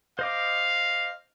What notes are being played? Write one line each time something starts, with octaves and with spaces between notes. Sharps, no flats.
C5 D#5 F5 D6